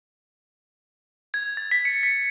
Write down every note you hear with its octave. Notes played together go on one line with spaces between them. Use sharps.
G#6
A6
B6
C#7
B6